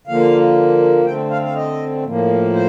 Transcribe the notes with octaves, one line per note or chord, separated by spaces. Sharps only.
D3 F3 A#3 F5
D3 A3 C4 G5
F5
F5
D#5
A2 F3 A#3
C5